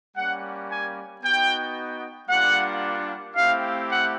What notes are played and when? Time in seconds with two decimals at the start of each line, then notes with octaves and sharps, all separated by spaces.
0.16 G3 A#3 C#4 F#5
0.69 G#5
1.22 B3 D#4 F#4 G5
2.28 G3 A#3 D4 F4 F#5
3.35 A3 C4 E4 G4 F5
3.88 F#5